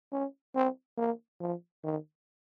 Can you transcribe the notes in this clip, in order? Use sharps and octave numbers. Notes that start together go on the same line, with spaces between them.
C#4
C4
A#3
F3
D#3